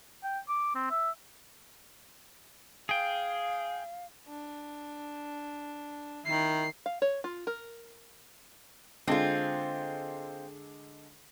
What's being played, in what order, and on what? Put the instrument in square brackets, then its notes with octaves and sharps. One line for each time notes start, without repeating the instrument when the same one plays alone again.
[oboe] G5
D6
C4
E5
[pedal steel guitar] G#4 G5 [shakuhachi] F5
[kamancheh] D4
[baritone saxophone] D#3 [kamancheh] E4 A#4 [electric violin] C7
[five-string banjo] F5
C#5
F4
A#4
[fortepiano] D3 G#3 A4 [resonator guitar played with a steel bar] C4 F4